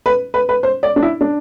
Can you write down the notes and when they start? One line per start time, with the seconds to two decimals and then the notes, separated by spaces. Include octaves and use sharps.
0.06 B4
0.34 B4
0.49 B4
0.63 C5
0.83 D5
0.96 D4
1.03 E4
1.21 D4